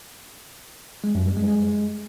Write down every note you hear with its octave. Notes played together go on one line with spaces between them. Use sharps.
G#3
F#2
G3
G#3
G#3